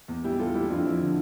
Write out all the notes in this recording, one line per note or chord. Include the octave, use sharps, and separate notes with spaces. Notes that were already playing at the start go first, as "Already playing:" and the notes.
E2
G3 E4 G4
G3 F4 A4
G3 E4 G4
F2 D4 F4
F3 E4
D3